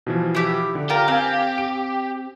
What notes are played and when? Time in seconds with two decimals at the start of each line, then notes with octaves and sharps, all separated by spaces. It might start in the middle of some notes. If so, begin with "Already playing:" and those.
0.07 B2 E3 F3
0.35 E4 G4
0.75 D3
0.90 F4 G4 A#4
1.08 C4 F5 G5 G#5
1.58 D7